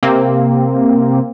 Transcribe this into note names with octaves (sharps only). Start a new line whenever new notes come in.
C3 A#3 C4